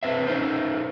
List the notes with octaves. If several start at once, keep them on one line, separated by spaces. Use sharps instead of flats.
C4 B4 C5 E5
C#4 D#4 A#4 C5